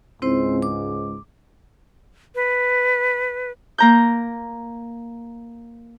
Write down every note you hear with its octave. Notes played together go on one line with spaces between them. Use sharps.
C#2 G#2 C4 E4 C5
D6
B4
A#3 A#5 G6